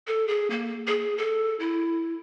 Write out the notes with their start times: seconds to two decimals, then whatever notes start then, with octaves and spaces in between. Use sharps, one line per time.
0.07 A4
0.28 G#4
0.50 A#3
0.87 G#4
1.18 A4
1.60 E4